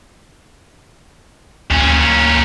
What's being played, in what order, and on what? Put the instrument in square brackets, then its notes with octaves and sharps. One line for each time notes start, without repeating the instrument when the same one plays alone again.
[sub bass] D2 [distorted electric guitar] A#2 C#4